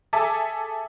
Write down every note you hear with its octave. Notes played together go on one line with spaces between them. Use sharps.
G#4 A4 E5 G#5 A5 D6